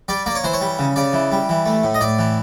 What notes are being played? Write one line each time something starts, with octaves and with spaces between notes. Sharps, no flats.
G3 D5
A#3 D5
C#5
E3 C5
C#5
G3
C#3
C#3 D5
E3
G3
E3
A3
A2
D#5
A2 D5
E3